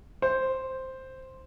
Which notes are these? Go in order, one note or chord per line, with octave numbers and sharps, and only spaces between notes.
C5